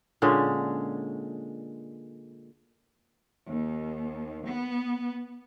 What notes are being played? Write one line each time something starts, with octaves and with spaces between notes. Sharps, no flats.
A#2 D3 G#3 C#4
D#2
B3